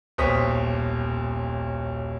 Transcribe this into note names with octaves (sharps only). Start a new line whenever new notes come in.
D#1 B1 C5 C#6 D#6 B6